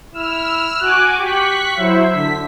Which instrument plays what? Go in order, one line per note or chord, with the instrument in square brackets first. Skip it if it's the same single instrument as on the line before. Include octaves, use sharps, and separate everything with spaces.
[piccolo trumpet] E4 [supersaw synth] E6 F6
[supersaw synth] F#4 G#5 D6 [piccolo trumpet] F#6
[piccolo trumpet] G4 [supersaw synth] C#6 F#6 B6
[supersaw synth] F#3 E4 C5 [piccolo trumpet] E5
[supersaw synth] D3 B6